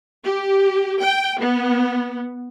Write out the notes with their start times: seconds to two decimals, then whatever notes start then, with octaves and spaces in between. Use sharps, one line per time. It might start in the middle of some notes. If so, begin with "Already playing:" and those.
0.24 G4
0.99 G5
1.39 B3